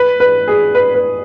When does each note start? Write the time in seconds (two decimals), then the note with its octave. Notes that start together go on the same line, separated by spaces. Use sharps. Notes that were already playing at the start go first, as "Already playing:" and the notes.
Already playing: B4
0.20 B4
0.48 G#4
0.75 B4
0.94 B4